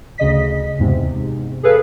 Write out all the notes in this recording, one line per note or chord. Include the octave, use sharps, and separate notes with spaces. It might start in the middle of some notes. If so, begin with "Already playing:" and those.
D2 C#3 D#5 B6
E2 G#2 C3
G#4 A4 B4 F5